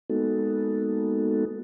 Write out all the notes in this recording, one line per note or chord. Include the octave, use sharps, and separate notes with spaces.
G#3 A#3 B3 D#4 F#4 A4